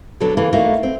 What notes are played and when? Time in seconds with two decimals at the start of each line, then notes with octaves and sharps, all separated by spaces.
0.20 B2 D3 F#3 D4 A4
0.37 C#3 E3 A#3 A4
0.52 A3 A#3 D#4 E4 F#4
0.83 C4